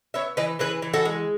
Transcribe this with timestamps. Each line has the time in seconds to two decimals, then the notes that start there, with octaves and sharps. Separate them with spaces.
0.14 B3 C#5 E5
0.37 E3 B4 D#5
0.59 E3 G#4 B4
0.82 E3
0.93 F#4 A4
1.05 G#3